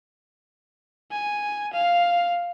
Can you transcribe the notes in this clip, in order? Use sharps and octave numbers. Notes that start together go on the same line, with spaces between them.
G#5
F5